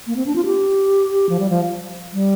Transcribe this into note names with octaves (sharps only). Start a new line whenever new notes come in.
A#3
C4
D4
F4
G4
F3
G3
F3
G3